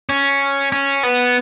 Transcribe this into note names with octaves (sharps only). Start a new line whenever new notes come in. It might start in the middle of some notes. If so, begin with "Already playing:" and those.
C#4
C#4
B3